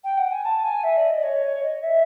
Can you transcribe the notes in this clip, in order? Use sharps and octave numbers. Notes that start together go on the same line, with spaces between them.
G5
F#5
G#5
A5
G#5
E5
D5
D#5
C#5
D#5
E5